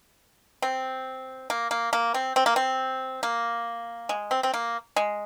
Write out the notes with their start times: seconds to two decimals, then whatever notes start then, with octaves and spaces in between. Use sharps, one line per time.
0.62 C4
1.50 A#3
1.71 A#3
1.93 A#3
2.14 C4
2.36 C4
2.46 A#3
2.56 C4
3.23 A#3
4.09 G#3
4.31 C4
4.43 C4
4.54 A#3
4.96 G#3